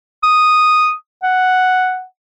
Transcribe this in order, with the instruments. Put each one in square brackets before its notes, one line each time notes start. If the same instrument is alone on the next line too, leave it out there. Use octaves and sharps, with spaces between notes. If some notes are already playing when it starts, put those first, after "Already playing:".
[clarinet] D#6
F#5